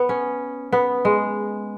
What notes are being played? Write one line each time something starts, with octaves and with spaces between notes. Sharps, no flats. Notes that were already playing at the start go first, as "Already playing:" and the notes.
Already playing: B3
C#4
B3
G#3